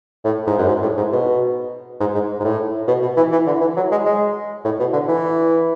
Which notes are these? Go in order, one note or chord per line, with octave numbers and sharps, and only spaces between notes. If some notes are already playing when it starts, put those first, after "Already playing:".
A2
G#2
F#2
G#2
A2
G#2
B2
G#2
G#2
G#2
A2
B2
B2
E3
E3
D3
E3
F#3
G#3
G#3
A2
B2
D3
E3